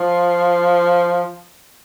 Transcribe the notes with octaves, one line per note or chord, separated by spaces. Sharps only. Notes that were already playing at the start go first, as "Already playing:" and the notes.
Already playing: F3